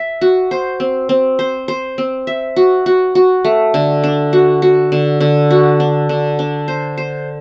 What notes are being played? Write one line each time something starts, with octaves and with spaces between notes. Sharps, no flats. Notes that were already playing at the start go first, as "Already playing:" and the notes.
Already playing: E5
F#4
C5
C4
C4
C5
C5
C4
E5
F#4
F#4
F#4
A3
D3
D4
F#4
F#4
D3
D3
F#4
D4
D3
D4
C5
C5